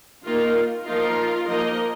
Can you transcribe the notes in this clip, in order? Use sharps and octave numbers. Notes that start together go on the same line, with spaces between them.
D#3 A#3 D#4 F4 A#4
F3 A#3 D#4 F4 A#4
F3 A#3 D#4 A#4 D#5